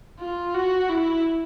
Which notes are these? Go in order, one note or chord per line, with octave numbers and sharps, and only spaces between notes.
F4
F#4
E4